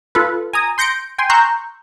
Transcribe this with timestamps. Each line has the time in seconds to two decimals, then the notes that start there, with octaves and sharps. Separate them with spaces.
0.15 F4 A4 B4
0.53 G#5 A#5 D#6
0.78 C6 G6 A#6 C#7 D7
1.18 G5 G#5 C6
1.30 A#5 C6 C#6 E6 F#6 G6